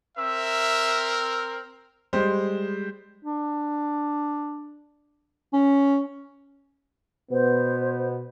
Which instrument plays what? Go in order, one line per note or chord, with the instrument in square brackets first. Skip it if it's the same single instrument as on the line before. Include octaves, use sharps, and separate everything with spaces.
[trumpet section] C4 A#4 [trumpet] E5 [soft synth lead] E6
[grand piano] G3 G#3 C5
[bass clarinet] D4
C#4
[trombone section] B2 B3 [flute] C5